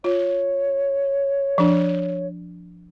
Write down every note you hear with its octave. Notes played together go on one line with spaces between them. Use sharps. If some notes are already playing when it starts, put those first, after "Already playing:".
F4 C#5
F3 D4